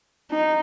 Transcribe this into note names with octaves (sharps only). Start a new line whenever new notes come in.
D#4